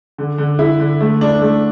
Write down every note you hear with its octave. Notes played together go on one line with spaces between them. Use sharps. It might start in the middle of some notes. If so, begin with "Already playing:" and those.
D3
D3
E4
D3
A3
D4
A3